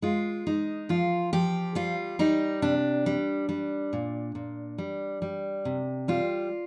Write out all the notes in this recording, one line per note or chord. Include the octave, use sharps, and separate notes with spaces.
G#3 F4
G#3 D#4
F3 F4
F3 G4
G3 F4
G3 D#4
C3 D4
G3
G3
A#2
A#2
G3
G3
C3
G3 F4